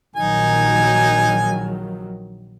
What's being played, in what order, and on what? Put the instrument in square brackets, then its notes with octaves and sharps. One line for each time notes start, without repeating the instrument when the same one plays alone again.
[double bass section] A#1 D#3 F#3 [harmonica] D#4 G#5